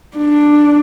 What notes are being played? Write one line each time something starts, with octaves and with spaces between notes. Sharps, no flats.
D4